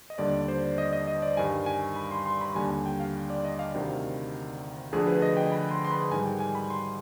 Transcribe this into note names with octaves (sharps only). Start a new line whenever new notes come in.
D#5
D#2 D3 G3 D5
C5
D#5
D#5
D#5
D5
G2 D#3 G3 G#5
G#5
B5
C6
C6
B5
D#2 D3 G3 G#5
G#5
G5
F5
D5
D#5
F5
D2 C3 D#3
D2 D3 F3 G#4
B4
D#5
G5
B5
C6
C6
B5
G#2 D#3 G3 G#5
G5
G#5
B5
C6